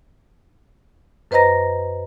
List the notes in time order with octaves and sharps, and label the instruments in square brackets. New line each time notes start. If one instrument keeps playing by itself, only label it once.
[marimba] F#2 B4 C5 D#5 A#5 A#6